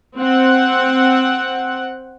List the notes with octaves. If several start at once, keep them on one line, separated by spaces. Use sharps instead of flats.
C4 F#5